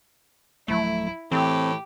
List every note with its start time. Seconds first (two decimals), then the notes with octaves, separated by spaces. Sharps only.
0.68 D1 F3 F#3 A3 E4
1.32 A2 E3 C4 G4